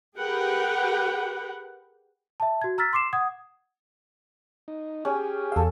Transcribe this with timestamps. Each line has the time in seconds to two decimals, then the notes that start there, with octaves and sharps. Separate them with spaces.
0.18 G4 G#4 A#4 B4 F#5 G5
2.40 E5 A5
2.62 F#4 G#6
2.78 A#5 E6 F6 A6 B6
2.93 C6 D6 C7 E7
3.13 F#5 D#6 G#6
4.68 D#4
5.05 C#4 G4 G#4
5.52 E2 A4 F5 E6